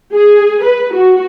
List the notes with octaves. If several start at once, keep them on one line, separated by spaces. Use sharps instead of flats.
G#4
B4
F#4